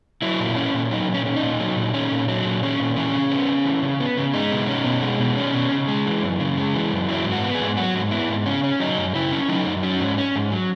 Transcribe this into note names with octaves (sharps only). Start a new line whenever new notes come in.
F#3 E4
A#2
C#4
A#2
F#3 D#4
A#2
C#4
C#4
D#4
A#2
F#3
A#2
C#4
A#2
F#3
A#2
C#4
A#2
E3 C#4
C#3
B3
C#3
E3
C#3
B3
C#3
G#3 D#4
B2
C#4
B2
G#3
B2
C#4
B2
C#3
G#3
E3
F#2
C#3
G#3
E3
F#2
F#3 E4
G#2
F#4
B3
G#4
G#2
F#3 F#4
G#2
B3 E4
G#2
C#3 C#4
C#4
F#3 D#4
F#2
C#3 E4
C#4
F#3 D#4
F#2
F#3 C#4
G#2
C#4
G#2
F#3